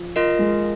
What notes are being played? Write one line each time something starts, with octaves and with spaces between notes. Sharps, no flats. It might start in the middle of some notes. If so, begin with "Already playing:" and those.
Already playing: F3
F4 A#4 D#5
G#3